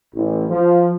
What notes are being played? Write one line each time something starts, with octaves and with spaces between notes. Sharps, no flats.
A1
F3